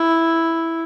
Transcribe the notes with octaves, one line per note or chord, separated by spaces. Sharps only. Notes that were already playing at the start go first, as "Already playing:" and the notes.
Already playing: E4